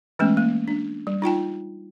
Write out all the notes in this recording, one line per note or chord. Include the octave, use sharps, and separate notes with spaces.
E3 G#3 A3 B3 C#4
A#3
D4
G3
D#4 F4 G5 A5